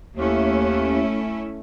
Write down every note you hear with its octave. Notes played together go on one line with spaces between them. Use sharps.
D#2 A3 C#4 E4